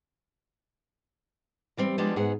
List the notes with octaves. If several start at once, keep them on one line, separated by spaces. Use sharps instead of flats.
E3 G3 C4
F3 G3 G#3 B3 D4
G#2 B3 G#4 F#5